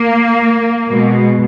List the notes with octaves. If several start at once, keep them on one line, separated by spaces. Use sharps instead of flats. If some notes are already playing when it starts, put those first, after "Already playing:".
Already playing: A#3
B2 G#3